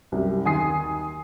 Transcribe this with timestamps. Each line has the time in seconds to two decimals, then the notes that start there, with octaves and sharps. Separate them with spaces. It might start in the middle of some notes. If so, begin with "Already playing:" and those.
0.12 C2 F#2 G4
0.45 D#2 D#3 G#5 C6 D#6 C7